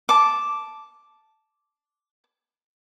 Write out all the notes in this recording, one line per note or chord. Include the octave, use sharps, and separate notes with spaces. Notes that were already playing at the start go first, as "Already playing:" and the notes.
A5 D6